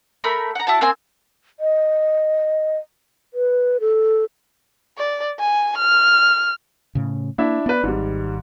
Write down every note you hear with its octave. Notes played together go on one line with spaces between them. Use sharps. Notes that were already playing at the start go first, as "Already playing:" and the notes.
A3 A#4 B5
F#5 A#5
E4 F#4 A5
A#3 C4 C5 G#5
D#5
B4
A4
D5
G#5
F6
A2 C#3
A#3 D4 E4 E5
B3 B4 D5
G#1 G#2 G3